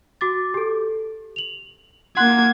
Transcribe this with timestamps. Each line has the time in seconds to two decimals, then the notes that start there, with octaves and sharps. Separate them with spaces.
0.21 F#4 D6 A6
0.54 G4 A4
1.36 F7 F#7
2.17 A#3 F#5 C6 F#6 G#6